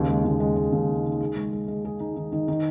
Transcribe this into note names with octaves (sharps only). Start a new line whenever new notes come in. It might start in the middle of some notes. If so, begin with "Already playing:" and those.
Already playing: D#2 C#3
G#3
D#2
G#3
G#3
D#2
D#3
D#3
G#4
G#3
G#3
G#3
G#4
D#4
D#3
D#3
D#3